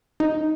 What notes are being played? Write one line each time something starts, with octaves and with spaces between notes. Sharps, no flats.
D#4